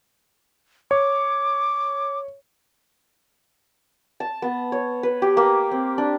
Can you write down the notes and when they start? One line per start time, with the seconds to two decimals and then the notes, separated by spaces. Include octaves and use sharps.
0.91 C#5 D6
4.20 A5
4.42 B3
4.72 C#5
5.03 B4
5.22 G4
5.37 A#3
5.71 C4
5.98 D4